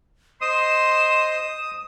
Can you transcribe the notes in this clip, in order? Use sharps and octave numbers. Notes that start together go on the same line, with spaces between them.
C5 D#5 C6 D#6 E7